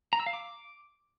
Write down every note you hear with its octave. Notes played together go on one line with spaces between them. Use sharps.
A#5
E6
F5
D6